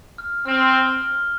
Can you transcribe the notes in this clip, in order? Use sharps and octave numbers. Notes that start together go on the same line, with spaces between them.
F6
C4 F6
G7
F6